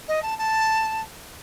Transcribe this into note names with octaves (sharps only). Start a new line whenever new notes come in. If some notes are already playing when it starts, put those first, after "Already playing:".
D#5
A5
A5